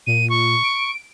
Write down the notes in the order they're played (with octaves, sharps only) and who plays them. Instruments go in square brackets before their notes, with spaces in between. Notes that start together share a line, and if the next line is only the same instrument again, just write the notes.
[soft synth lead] A#2 [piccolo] D#7
[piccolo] C#6
[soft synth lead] D7